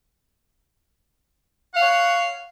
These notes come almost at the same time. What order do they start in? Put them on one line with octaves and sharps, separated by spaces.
F#5 F5 C#5